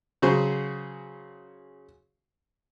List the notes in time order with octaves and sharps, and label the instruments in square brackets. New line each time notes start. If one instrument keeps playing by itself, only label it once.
[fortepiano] C#3 F#3 F#4 G#4 C5